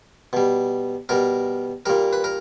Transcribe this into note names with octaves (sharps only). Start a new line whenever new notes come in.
B2 G3
B2 G3 A#4
A#2 G3 A#4
B4
A#4